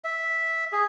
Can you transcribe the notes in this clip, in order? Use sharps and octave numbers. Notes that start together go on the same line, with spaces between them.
E5
G#4